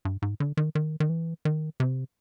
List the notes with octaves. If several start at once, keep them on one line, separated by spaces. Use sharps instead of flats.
G2
G#2
D3
D#3
D#3
D#3
E3
D#3
C3